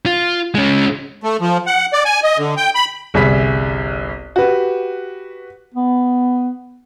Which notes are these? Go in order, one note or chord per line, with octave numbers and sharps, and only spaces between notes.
F4
G#3 C#4
A3
F3
F#5
D5
G#5
D#5
D3
G5
B5
G1 C2 G#4 E5 B5 B6
F#4 G4 B4
B3